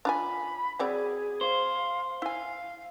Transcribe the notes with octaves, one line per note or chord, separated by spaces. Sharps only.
D4 F4 G#5 B5
F#3 C4 G#4 D5
C5 F5
E4 F5 G#5